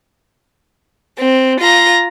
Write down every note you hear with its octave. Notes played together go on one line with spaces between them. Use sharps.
C4
F4 A#5